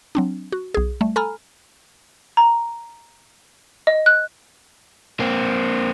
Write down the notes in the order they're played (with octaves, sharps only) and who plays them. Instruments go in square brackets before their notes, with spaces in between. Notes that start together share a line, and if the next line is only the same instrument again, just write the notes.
[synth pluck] F#3 C4 D4
F#4
B1 G#4
G3 A3
A4 G#5 A#5 B5 F6
[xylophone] A#5
D#5
F#6
[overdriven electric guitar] A#3 C4